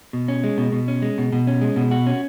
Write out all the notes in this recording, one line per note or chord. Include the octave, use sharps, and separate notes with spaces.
B2
C#4
G#3
B2
B2
C#4
G#3
B2
B2
C#4
G#3
B2
F#4
C#4